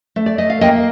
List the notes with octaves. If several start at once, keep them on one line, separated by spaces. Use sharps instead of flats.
A3
D5
A3 D#5
F5
A#3 D#5 G5